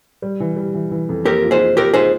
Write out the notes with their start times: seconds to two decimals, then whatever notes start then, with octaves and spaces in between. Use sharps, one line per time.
0.22 G3
0.40 E3
0.56 G3
0.74 E3
0.91 E3
1.09 F2
1.25 A#3 G4 A#4
1.43 F4
1.51 G#4 C5
1.60 F4
1.77 F4 G4 A#4
1.94 F4 G#4 C5